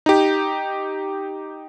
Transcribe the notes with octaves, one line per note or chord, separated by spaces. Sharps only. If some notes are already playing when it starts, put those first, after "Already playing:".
D#4 G4